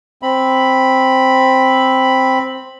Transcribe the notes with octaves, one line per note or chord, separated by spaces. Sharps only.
C4 B5